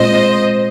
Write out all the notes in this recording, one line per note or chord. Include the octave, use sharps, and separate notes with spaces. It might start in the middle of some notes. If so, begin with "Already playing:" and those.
Already playing: A#2 G#3 C4 F4 C5 D#5